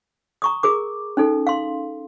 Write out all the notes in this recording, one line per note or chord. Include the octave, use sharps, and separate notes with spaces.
A#5 C#6 D#6
G#4 A#4 D6
C#4 D#4 A4
F5 C6